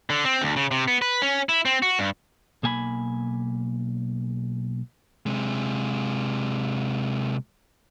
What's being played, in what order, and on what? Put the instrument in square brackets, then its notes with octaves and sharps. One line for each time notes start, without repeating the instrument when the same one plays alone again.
[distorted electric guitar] D3
C4
D2
C#3
C3
B3
B4
C#4
E4
C4
F#4
G2
[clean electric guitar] B1 A#3 G#5 A5 B5
[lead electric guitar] C3 G#3